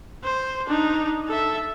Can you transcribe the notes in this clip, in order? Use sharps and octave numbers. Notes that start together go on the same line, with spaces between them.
C5
D4 D#4
A4 E5